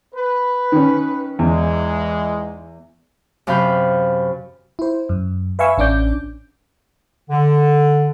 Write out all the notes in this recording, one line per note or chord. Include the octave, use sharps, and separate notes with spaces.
B4
D#3 C#4
E2 G#2 E3 G#3
F#2 C3 F5 B5 G6
E4 C5
F#2
B4 E5 F5 G#5 C#6 E6
A1 C#4 D4 D6 G6
D3